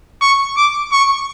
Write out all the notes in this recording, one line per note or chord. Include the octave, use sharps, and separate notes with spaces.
C#6
D6
C#6